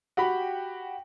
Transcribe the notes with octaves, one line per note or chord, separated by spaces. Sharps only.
F#4 G4 G5 B5